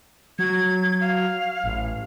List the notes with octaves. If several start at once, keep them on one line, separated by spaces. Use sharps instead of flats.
F#3 G#6
F5
A1